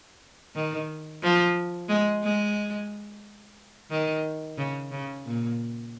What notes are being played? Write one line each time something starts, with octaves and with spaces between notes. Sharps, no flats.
D#3
F3
G#3
G#3
D#3
C#3
C#3
A#2